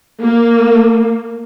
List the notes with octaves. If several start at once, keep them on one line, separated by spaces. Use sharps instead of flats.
A#3